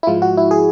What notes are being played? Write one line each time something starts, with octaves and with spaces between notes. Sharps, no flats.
E4
G#2 F3 G#3 F4
F#4
E4
G#4